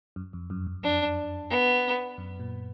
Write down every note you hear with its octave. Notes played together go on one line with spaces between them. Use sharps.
F#2
F2
F#2
F#2
F2 D4
B3
F#2
A#2